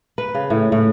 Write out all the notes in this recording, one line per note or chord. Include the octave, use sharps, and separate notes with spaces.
B4
C#3
A2
A2